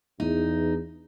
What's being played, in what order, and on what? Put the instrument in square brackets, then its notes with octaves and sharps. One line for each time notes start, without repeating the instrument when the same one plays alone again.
[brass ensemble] E2 [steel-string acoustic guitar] D#4